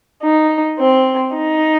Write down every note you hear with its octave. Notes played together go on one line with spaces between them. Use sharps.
D#4
C4
D#4